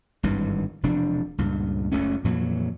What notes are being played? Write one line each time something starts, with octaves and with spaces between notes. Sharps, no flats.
G#1 G2 D#3 E3
E1 C3 F3 D4
C#2 G2 A#2
F#1 C#2 A3 C#4
F2 A#2 E3 F#3